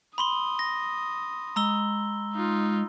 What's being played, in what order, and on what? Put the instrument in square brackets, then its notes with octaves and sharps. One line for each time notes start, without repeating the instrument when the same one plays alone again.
[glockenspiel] B5 C6 G7 [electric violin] D#6
[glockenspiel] A#6
[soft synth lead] G#3 [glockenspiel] A#5 E6 G7
[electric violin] D#4 F4